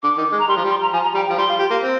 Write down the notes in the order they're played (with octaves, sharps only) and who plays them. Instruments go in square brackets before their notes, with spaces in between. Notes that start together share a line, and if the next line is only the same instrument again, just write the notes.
[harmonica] D3 [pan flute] D6
[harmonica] D#3
G#3
[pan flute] A#5
[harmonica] G3 [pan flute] C6
[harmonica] F3
G3
[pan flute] C6
A#5
[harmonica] F3 [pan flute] G#5
[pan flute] A#5
[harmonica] G3 [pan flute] G5
[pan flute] G5
[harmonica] F3
[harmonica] G3 [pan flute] C6
[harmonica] F4
G4
A#3
C4